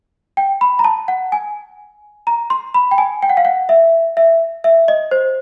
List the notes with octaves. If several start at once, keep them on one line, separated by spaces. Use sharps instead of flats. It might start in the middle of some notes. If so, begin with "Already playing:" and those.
G5
B5
A#5
A5
F#5
G#5
A#5
C6
B5
G5
G#5
G5
F#5
F5
F#5
E5
E5
E5
D#5
C5